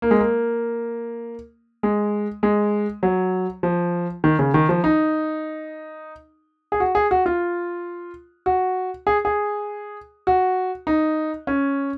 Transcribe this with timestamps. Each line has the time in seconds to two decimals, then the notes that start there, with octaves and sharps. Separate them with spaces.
0.02 A#3
0.11 G#3
0.19 A#3
1.83 G#3
2.43 G#3
3.03 F#3
3.63 F3
4.24 D#3
4.39 C#3
4.54 D#3
4.69 F3
4.84 D#4
6.72 G#4
6.80 F#4
6.95 G#4
7.11 F#4
7.26 F4
8.46 F#4
9.07 G#4
9.25 G#4
10.27 F#4
10.87 D#4
11.47 C#4